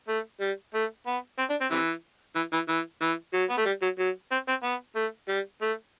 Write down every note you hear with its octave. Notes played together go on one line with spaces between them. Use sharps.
A3
G3
A3
B3
C4
D4
C4
C3 E3
E3
E3
E3
E3
F#3
B3
A3
G3
F#3
F#3
C4
C4
B3
A3
G3
A3